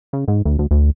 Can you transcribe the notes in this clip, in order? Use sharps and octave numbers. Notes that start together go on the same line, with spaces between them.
C#3
G#2
D2
D2
D2